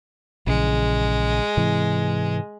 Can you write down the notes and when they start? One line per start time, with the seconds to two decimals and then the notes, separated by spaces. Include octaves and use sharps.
0.47 A#1 C#3 E3 G#3
1.57 G#2 C3 E3